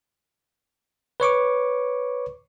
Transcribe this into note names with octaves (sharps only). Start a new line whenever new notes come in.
B4 C#5 C#6 D6